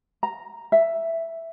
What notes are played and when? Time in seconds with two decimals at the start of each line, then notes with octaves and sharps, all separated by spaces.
0.23 A#5
0.72 E5